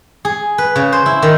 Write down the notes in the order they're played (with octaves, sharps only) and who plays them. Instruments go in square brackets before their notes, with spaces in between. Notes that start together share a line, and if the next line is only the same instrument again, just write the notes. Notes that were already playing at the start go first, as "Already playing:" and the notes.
[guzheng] G#4
B4
C#3
C5
E4
D#3